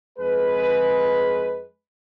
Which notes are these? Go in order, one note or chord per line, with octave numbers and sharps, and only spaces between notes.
F2 G#3 G#4 B4